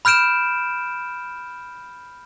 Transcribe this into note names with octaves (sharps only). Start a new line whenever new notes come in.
B5 F6 G6 D7 E7